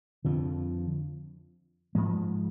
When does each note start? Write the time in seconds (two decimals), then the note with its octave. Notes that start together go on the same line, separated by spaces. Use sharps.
0.25 F2 D3 F3
1.95 G#2 F3 G#3